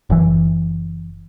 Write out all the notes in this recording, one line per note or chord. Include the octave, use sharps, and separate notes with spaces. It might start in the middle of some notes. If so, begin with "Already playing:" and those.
F#1 E3